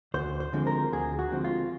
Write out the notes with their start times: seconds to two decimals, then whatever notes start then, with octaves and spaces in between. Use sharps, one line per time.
0.14 D2 C5
0.40 C5
0.53 D3 F3 G#3 C4
0.67 A#4
0.92 D2 G#4
1.19 F#4
1.32 D3 F3 G#3 C4
1.44 F4